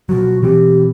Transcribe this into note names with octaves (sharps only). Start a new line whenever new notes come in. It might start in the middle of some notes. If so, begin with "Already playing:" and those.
B2 F3 F#3 F#4
B2 E3 C4 G4